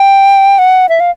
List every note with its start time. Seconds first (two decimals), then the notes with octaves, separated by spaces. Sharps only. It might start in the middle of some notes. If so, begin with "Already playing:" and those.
Already playing: G5
0.59 F#5
0.89 E5
1.00 F5